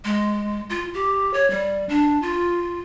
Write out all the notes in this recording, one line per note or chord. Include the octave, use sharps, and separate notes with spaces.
G#3
F4
G4
C#5
G3
D4
F4